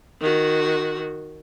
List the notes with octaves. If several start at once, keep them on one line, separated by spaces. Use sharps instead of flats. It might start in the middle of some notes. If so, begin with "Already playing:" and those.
D#3 F#4